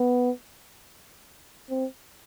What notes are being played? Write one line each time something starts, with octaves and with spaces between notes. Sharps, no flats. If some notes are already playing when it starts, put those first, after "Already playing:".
Already playing: B3
C4